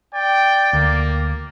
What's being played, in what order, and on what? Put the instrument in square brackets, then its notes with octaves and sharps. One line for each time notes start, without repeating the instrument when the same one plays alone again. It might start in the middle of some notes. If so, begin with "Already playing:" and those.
[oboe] D5 [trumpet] G5
[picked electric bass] D2 [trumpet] A#3